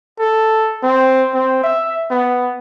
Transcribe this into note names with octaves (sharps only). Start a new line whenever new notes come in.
A4
C4
C4
E5
B3